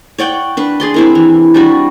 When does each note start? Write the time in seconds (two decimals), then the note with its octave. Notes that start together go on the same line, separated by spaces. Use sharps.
0.18 C#5 D5 F#5 G5
0.57 D4 B4
0.80 G#4 D5 C6
0.94 C4 E4 A#4
1.15 E3
1.54 G3 D4 F#4